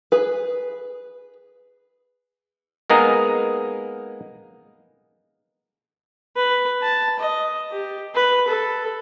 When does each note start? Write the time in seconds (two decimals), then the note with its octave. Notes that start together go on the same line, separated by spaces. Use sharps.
0.12 G#4 B4
2.90 G#3 A#3 B3 D#4 G#4 A#4
6.36 B4
6.82 A5
7.20 D#5
7.72 G4
8.15 B4
8.48 A4